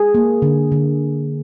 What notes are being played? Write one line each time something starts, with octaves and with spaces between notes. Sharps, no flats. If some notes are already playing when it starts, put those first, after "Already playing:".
Already playing: G#4
A#3
D3
D3